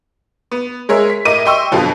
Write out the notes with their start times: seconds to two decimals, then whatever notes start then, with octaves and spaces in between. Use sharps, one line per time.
0.51 B3
0.89 G#3 G#4 A#4 C#5 E5
1.10 B6
1.25 A2 A#4 D#5 D6 D#7
1.46 D#5 E5 G5 C6 C#6 E6
1.71 F2 B2 D3 F3 F#3